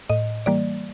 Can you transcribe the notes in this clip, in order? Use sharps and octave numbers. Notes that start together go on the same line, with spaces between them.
A2 D#5
E3 G3 A#3 D5